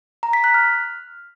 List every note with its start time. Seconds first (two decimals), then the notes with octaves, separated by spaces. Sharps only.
0.23 A#5
0.33 B6
0.44 F#6
0.54 F6